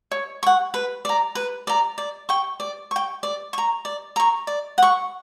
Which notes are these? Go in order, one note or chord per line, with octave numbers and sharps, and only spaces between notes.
C#5
F#5 C#6
B4
D5 A#5
B4
D5 A#5
D5
G5 C#6
D5
G5 C#6
D5
A#5 C#6
D5
A#5 C#6
D5
F#5 C#6